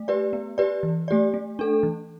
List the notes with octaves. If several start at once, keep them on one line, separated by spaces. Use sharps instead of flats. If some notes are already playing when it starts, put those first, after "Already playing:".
Already playing: A3
G4 B4 D5
B3
G4 B4 D5
E3
A3 G4 D5
A3
D4 A4
E3